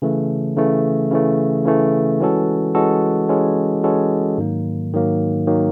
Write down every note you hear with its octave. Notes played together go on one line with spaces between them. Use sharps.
C#3 E3 A3
C#3 E3 A3
C#3 E3 A3
C#3 E3 A3
E3 G#3 C#4 F#4 A4
E3 G#3 C#4 F#4 A4
E3 G#3 C#4 F#4 A4
E3 G#3 C#4 F#4 A4
G#2 D#3 F#3 A#3
G#2 D#3 F#3 A#3
D#3 F#3 A#3